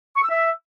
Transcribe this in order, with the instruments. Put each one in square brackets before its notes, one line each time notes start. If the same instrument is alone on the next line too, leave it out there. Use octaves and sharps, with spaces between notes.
[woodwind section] C#6
E6
E5